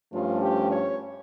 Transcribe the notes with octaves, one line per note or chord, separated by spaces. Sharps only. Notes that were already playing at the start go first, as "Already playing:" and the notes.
G2 F3 A3 C#4 F4
G4
C#5